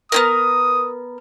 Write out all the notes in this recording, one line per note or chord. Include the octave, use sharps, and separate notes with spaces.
B3 C#4 A#4 D#6